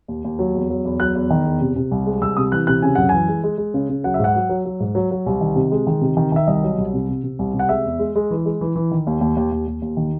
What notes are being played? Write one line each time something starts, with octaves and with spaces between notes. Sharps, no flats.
D#2
D#2
F#3
E2
F#3
E2
F#3 F#6
E2
D#3
E2
C3
C3
C2
G#3
C2 E6
C3 D#6
E3 F#6
C3 F#6
C#3 G#5
F#2 F#5
E3 G#5
G#3
G#3
G#3
C#3
C#3
F#3 F#5
E5
G#2 F#5
F#3
F#3
F#3
G#2
F#3
F#3
C2
D#3
C3
G#3
D#3
C3
D#3
D#3 E5
C2 D#5
F#3
C2
C3
C3
C3
C2
C3
F#5
G#3 E5
E2
G#3
G#3
E3
G#3
E3
E3
D#3
D#2
D#2
D#2
D#2
D#2
D#2
D#3